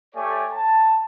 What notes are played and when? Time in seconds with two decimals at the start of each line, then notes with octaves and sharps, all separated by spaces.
0.15 A3 G4 C#5 D5 G#5
0.51 A5